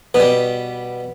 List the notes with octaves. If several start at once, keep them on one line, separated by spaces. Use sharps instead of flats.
B2 B3
G3